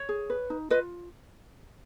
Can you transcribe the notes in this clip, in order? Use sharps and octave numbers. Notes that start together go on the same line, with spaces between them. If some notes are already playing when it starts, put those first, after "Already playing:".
Already playing: C#5
G#4
B4
D#4
F4 B4 D#5